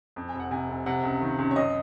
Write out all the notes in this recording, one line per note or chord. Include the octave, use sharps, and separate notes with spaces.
F2
G#5
F1
F#5
C3 G#5
F1
C3 F#5
C#2
D#3
C#2
C#5
F#2 D#5